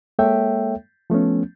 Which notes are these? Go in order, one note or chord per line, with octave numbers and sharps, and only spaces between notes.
G#3 A#3 A4 C#5 E5 G5
F3 A3 B3 C#4